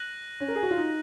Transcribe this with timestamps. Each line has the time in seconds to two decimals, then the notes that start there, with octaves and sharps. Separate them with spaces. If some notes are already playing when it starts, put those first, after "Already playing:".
Already playing: F#6 A#6 D#7 F#7
0.40 C#4
0.48 A#4
0.56 G#4
0.63 F#4
0.71 F4
0.77 D#4